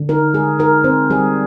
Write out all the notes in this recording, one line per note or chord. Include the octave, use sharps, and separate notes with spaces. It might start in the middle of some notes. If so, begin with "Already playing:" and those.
Already playing: D3
D#4 A#4
G#3 G#4
D#4 A#4
C4 C5
G3 G#4